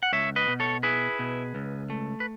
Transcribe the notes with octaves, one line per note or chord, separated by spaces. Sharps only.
F#5
C#2 C#5 E5
B4 D#5
B2
A4 C#5
E4 G#4 B4
B2
C#2
A3
B4